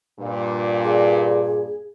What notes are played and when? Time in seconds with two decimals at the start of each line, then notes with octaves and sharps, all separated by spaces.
0.19 G2 A#2
0.84 G#4